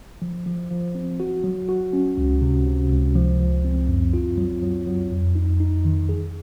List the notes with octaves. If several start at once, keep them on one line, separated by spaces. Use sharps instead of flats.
F3
F3
F3
C4
F#4
F#3
F#4
C#4
C#2
C3
C3
C#2
F3
F3
C4
F#2
F4
F#3
F#3
F#3
F2
D#4
D#4
D#3
G#4